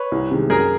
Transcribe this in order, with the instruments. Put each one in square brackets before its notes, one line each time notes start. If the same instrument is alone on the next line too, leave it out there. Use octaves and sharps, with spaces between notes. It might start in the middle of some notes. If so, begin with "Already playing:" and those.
Already playing: [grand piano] B4 C#5
[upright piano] C2
C3 D#3 G#3
[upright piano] F#2 [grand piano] G#4 A#4